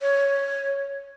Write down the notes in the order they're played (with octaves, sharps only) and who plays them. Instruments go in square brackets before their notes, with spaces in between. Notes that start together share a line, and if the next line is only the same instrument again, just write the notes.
[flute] C#5